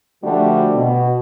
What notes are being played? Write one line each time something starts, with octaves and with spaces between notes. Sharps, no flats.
D3 F3 G3 A3 D4 F#4
B2